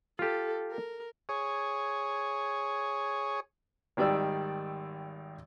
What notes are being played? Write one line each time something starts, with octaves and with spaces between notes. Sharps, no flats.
F4 G4 A4
A#4
G#4 C#5
G#1 D#3 G3 D5 E6